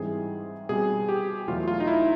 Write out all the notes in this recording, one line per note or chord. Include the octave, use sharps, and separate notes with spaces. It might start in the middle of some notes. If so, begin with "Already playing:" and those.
Already playing: G#2 E3 G3 C4 G#4
B2 G3 C4 G#4
G4
E2 B2 F#3 A3 F4
F4
D#4
E4